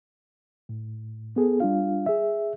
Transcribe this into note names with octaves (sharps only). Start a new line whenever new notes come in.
A2
B3 G#4 A4
G3 D4 F4 F5
G#4 E5